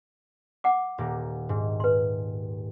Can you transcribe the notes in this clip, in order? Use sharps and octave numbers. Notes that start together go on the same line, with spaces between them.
F#5 D6
D#1 A#3
G#2
B4 C6